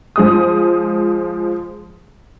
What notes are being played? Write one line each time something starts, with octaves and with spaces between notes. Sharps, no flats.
F3 G#3 D#6